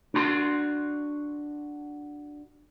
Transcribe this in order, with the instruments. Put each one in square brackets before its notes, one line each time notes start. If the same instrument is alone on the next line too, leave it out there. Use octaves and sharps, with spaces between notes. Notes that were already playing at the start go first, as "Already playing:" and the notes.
[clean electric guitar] D4 F#4 B5 C6